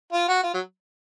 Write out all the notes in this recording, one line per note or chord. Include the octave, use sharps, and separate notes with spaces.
F4
F#4
F4
F#3